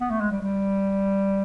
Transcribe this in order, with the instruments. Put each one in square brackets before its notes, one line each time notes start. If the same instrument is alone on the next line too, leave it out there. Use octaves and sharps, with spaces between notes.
[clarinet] B3
A3
G#3
G3
G3